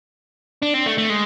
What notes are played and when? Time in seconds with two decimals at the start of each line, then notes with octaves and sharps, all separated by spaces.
0.63 D4
0.74 C4
0.86 A3
0.98 A3
1.10 G#3